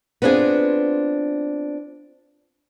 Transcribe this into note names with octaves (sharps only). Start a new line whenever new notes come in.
B3 C4 D4 F4 G#4